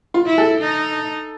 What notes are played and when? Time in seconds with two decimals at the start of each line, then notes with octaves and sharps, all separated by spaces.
0.14 F4
0.27 E4
0.38 A4
0.61 D#4